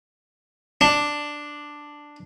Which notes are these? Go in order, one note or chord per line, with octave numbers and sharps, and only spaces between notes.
D4